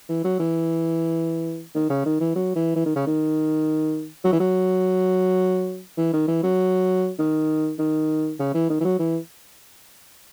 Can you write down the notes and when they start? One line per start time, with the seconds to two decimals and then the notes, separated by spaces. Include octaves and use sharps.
0.09 E3
0.24 F#3
0.39 E3
1.75 D#3
1.90 C#3
2.05 D#3
2.21 E3
2.36 F#3
2.56 E3
2.76 E3
2.86 D#3
2.95 C#3
3.07 D#3
4.24 F#3
4.32 E3
4.40 F#3
5.97 E3
6.13 D#3
6.28 E3
6.43 F#3
7.19 D#3
7.79 D#3
8.40 C#3
8.54 E3
8.70 D#3
8.80 E3
8.85 F#3
8.99 E3